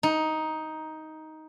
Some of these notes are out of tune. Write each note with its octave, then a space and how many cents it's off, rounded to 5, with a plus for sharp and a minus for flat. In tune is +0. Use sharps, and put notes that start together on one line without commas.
D#4 +10